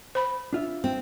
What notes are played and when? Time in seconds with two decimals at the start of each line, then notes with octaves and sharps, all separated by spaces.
0.15 C5 B5
0.53 D4 F4 E5
0.84 C4